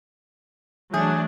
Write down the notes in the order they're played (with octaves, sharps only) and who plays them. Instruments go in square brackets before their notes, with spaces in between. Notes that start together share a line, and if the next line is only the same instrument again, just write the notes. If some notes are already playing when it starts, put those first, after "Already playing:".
[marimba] E3 [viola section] F#3 A3 D4 [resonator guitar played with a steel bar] G#4